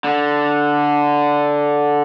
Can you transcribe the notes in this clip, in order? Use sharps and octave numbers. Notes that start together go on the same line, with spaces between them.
D3